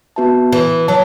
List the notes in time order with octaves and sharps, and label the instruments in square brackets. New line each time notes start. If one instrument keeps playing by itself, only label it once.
[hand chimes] B3 F#4 B4 E5 A5
[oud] E3
[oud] F#3 [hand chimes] A5